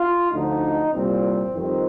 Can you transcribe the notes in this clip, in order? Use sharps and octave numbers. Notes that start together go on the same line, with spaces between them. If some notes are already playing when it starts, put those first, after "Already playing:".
Already playing: F4
D2 D3 F3 D#4
C2 A#2 G3 C4
F2 D#3 G3 C4